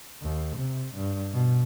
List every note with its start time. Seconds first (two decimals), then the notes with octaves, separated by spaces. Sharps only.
0.22 D#2
0.56 C3
0.95 G2
1.33 B2